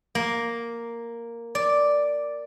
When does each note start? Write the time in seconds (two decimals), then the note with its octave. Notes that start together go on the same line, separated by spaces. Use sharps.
0.15 A#3
1.55 D5